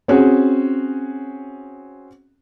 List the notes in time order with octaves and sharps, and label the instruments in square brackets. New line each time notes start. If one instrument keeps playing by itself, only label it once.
[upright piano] C4 C#4 F#4 G#4